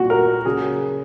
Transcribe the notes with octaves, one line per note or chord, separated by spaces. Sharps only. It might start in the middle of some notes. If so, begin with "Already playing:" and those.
Already playing: A#2 G3 F#4
A#4
C#3 F#3 G#4